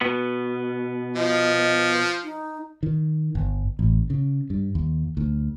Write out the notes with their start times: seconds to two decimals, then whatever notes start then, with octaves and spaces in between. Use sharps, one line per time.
0.01 B2 B3
1.16 F3 D#5
2.24 D#4
2.83 D#3
3.35 G1
3.79 A1
4.10 C#3
4.50 G2
4.75 D#2
5.17 D2